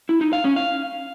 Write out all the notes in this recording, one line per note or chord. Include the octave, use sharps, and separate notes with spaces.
E4
D#4
F5
C#4
F5